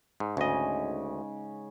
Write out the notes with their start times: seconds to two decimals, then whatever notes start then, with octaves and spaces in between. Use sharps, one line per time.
0.20 G#2
0.37 D2 G#2 C#3 D#5